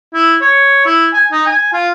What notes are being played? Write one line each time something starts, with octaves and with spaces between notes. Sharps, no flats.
E4
C#5
E4
G#5
D#4
G#5
F4